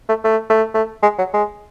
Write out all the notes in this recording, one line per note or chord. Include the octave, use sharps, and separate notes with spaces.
A3
A3
A3
A3
G#3
F#3
G#3